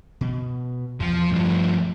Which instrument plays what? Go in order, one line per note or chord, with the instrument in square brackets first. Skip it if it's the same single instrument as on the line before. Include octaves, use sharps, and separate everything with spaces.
[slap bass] B2
[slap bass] E2 [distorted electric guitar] F3
[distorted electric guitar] G2 F3 [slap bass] A3